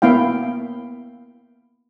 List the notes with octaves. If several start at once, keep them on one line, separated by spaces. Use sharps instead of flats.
A#3 B3 E4 F5 G5